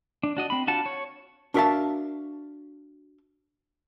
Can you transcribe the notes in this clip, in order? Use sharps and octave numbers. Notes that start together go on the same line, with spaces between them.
D4
D4 F#4 D#5
C4 B5
D4 F4 F#4 F#5 A5
C#5
D4 F#4 A#4 E5 F5 A5